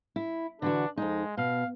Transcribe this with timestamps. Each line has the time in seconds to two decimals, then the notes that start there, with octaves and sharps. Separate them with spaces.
0.16 E4
0.62 D3 E3 D4 F#4
0.97 F2 G#3 D#4
1.37 B2 F5